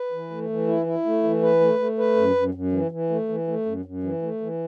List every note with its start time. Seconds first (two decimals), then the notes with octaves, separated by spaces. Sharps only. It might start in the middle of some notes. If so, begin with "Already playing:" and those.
Already playing: B4
0.12 E3
0.30 A3
0.49 E3
0.68 E4
0.86 E4
1.05 A3
1.24 E3
1.42 B4
1.61 A3
1.79 A3
1.98 B4
2.16 F#2
2.35 F#2
2.54 F#2
2.72 E3
2.91 E3
3.10 A3
3.29 E3
3.47 A3
3.66 F#2
3.85 F#2
4.03 E3
4.22 A3
4.41 E3